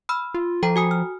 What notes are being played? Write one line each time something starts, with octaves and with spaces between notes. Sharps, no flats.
B5 E6 F6
F4
F3 A4 G5 A#5
F#4 G#5 D#6
F6